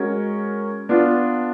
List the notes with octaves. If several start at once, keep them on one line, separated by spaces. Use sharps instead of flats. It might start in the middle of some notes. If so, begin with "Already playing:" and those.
Already playing: G#3 C#4 F#4 A#4 C#5
B3 D4 F4